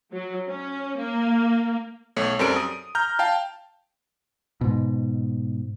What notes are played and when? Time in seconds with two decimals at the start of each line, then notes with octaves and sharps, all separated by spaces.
0.12 F#3
0.48 C#4
0.97 A#3
2.16 B1 A3 C#5
2.39 F#2 G3 C4 A4 A#4 D7
2.56 D#6
2.95 A#5 F6 G6
3.19 F5 G5 A5
4.61 G#2 B2